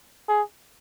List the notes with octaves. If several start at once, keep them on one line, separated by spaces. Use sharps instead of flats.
G#4